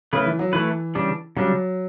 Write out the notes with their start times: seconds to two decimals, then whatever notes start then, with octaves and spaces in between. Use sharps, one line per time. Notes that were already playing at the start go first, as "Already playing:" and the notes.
0.13 C#3 A3 E4 B4
0.26 E3
0.39 F#3
0.53 E3 A3 E4 B4
0.95 C#3 G3 D4
1.36 C#3 F#3 G3 D4